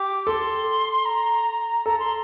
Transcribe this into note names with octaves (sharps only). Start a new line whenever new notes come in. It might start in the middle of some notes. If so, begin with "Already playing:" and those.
Already playing: G4 D6
A4 C6
A#5
A4 A#5
C6